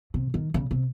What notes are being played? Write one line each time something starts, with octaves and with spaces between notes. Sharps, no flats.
C3
D#3
C#3
C3